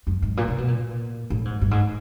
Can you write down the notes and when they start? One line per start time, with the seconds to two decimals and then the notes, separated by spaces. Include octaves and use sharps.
0.07 F#2
0.22 G#2
0.37 A#2
0.48 C3
0.58 B2
0.68 A#2
1.30 A2
1.45 G#2
1.61 G2
1.71 G#2